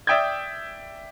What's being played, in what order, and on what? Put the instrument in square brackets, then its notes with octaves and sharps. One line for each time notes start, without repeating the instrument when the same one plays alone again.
[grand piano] D5 E5 G5 D#6 G6 G#6